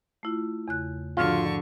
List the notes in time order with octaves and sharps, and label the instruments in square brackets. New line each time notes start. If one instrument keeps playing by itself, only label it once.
[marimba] A3 E4 F4
E2 C#3 F#6
[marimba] G#2 F3 F#4 [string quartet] D3 C#6 [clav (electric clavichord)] F4